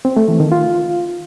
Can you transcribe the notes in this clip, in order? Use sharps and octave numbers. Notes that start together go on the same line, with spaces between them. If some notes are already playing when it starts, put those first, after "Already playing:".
C4
A3
E3
D#3
F4